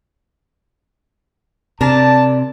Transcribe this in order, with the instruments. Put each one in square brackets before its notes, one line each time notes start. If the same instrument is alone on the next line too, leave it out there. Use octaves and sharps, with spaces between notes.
[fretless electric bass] C3 [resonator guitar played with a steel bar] D4 A#4 [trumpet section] A5